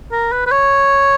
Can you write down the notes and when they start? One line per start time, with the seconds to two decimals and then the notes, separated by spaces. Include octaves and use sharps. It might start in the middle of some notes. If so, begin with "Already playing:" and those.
0.12 A#4
0.32 B4
0.47 B4
0.51 C#5